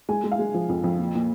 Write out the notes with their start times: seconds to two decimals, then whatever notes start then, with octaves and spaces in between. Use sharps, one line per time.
0.09 G#3 G#5
0.24 G#3
0.31 F5
0.39 G#3
0.54 F3
0.69 F2
0.84 F2
0.99 A#2
1.15 A#2